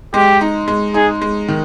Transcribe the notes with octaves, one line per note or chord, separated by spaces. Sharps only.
G#3 G4
D#4
G#3
D#4 G#4
G#3
D#3